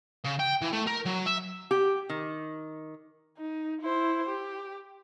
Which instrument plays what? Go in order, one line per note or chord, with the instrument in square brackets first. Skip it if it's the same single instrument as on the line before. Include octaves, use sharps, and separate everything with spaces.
[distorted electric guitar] C#3
G5
E3
A3
A#4
F#3
E5
[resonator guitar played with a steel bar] G4
D#3
[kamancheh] D#4
E4 C5
G4